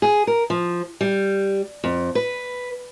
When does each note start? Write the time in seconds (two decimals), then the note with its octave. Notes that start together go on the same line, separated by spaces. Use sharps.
0.02 G#4
0.27 A#4
0.50 F3
1.01 G3
1.84 F2
2.15 B4